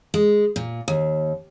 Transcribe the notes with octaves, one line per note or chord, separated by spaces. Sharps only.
G#3
A#2
D#2